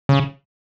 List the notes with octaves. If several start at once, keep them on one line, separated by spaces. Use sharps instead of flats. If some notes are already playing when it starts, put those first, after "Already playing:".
C#3